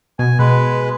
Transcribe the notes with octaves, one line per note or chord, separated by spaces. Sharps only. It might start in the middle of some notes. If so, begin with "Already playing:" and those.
B2 G#5
B2 G#3 B4